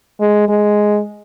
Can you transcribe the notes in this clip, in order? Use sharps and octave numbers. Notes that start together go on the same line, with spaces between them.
G#3
G#3